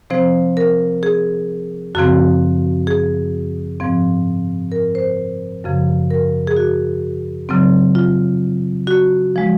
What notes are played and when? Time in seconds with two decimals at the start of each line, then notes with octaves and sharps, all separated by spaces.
0.10 C3 F3 C4 C5
0.57 A#4
1.03 G#4
1.95 F#2 C#3 F3 C4 F#4
2.87 G#4
3.80 G#2 F3 C4
4.72 A#4
4.95 C5
5.64 F#2 C#3 F3
6.10 A#4
6.47 G#4
6.57 F#4
7.49 C#3 F#3 C4
7.95 F4
8.87 F#4
9.36 F3 G#3